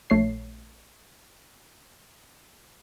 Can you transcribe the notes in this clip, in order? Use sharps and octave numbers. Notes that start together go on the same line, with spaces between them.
A#1 A3 C#5 C7